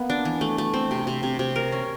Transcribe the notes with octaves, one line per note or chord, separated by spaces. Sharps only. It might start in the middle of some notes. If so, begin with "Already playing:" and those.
Already playing: A#3 B3
D4
E3
A3
A3
C4
C3
C3
C3
C3
A#4
C#4